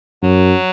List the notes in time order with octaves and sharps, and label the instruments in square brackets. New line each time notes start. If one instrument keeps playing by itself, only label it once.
[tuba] F#2 [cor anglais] F#3